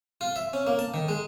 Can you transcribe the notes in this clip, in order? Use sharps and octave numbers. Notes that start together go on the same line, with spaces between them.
F4
E5
C#4
A#3
A5
D#3
G#3